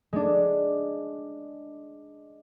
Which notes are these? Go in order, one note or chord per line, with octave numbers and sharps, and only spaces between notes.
G#3 D4